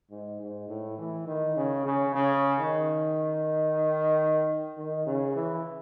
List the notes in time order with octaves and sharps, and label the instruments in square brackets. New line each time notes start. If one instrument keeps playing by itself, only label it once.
[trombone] G#2
G#2
A2
E3
D#3
C#3
C#3
C#3
D#3
D#3
C#3
E3